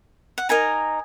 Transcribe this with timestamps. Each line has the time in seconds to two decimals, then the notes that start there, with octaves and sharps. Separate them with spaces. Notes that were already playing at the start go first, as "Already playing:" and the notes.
0.38 F#5
0.49 D#4 A#4 D#5 G#5